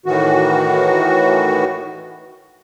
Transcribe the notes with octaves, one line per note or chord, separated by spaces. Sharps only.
A2 D#3 E3 F#4